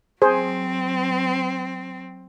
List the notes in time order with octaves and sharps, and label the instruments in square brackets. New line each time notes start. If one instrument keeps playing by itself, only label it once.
[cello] F#3 C4 [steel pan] G#4 C5